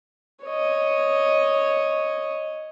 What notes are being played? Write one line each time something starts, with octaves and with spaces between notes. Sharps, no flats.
C#5 D#5